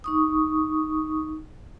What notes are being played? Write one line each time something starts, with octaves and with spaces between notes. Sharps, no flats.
D#4 C#6 D#6